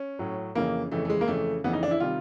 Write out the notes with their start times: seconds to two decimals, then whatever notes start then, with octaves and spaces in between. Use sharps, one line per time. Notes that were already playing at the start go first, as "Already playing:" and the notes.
Already playing: C#4
0.19 A2 F#3
0.56 F2 C#3 E3 A#3
0.91 F2 C#3 E3 A3
1.05 A3
1.10 G#3
1.21 A#3
1.27 F2 C#3 E3 A3
1.64 F2 C#3 E3 B3
1.73 D#4
1.83 D4
1.91 E4
2.00 C3 D#3 G3 F4